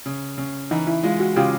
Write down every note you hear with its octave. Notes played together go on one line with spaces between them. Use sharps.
C#3
C#3
E3 D#4
E4
G#3 F4
F#4
C#3 F4 G4